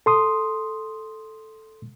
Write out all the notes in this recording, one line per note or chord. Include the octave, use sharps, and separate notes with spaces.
A4 C6 D#6